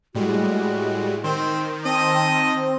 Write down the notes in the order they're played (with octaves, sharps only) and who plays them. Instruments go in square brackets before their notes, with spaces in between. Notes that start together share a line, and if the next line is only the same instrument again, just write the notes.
[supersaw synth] A2 G3 G#3 [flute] F#4
[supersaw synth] D#3 [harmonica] C4 C5 [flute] G5
[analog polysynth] C4 [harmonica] D#5 D#6 [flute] A5